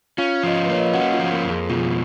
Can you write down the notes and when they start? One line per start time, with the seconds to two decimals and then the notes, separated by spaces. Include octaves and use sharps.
0.18 C#4 F4 F5
0.43 F3 D#5
0.56 F4 F5
0.65 B4
0.69 A#3 C#5
0.79 D#5
0.87 F5
0.94 C#4 F#4 F#5
1.13 F4 F5
1.19 F3
1.31 A#3 A#4
1.45 F2
1.50 G#4
1.69 B2 F4